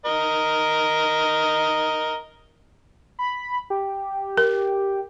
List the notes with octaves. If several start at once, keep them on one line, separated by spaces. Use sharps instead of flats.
A#4 D#5
B5
G4
A#4